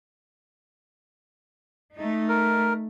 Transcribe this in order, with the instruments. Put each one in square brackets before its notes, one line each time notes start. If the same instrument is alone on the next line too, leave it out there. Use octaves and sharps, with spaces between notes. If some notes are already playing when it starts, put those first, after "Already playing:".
[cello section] A3 D#4
[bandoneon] A#4